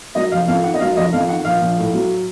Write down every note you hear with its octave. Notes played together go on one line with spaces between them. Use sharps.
F#3 D#5
F1 F5
F2 F5
D#3 F#5
D#5
F#3 F5
F1 D#5
F2 F5
D#3 F#5
A#1 F5
A#1
A2
F#3